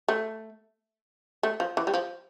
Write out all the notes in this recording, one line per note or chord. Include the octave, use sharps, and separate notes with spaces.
A3
A3
F3
E3
G3
F3